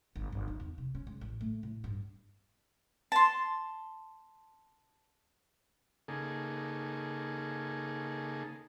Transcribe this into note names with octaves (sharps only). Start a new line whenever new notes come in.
G1
G1
D#4
E2
C3
C#4
G#3
A1
A3
A2
G2
A5 C6
C#3 A#3 D#4 G#4 A4